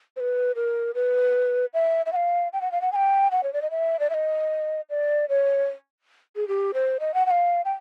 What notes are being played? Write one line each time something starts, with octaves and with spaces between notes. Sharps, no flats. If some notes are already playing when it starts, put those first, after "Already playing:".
C5
B4
A#4
B4
E5
E5
F#5
F5
G5
F#5
F5
F#5
G#5
G5
F#5
C#5
D5
D#5
E5
D5
E5
D#5
D5
C#5
G#4
G4
C5
D#5
F#5
F#5
F5
G5